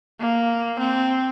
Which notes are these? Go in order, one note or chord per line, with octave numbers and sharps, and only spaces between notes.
A#3
C4